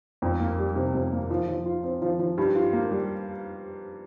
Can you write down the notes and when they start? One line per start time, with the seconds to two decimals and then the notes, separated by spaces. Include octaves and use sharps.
0.22 F2
0.40 A#3
0.58 G3
0.76 C3
0.94 F2
1.12 A#3
1.30 F3
1.48 F3
1.66 F4
1.84 C4
2.02 F3
2.19 F3
2.38 G2
2.56 F4
2.73 A#3
2.91 G3